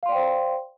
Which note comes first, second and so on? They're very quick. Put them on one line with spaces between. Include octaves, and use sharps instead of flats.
F5 C6 D5 G5 C5